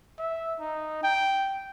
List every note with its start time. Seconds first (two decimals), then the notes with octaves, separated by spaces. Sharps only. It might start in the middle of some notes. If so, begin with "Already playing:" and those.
0.19 E5
0.60 D#4
1.03 G5